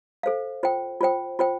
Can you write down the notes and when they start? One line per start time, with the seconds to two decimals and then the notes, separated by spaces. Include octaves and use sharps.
0.23 A4 C5 F5
0.63 F4 C5 G5
1.01 F4 C5 G5
1.39 F4 C5 G5